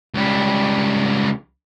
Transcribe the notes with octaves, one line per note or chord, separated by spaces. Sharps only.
C#2 G3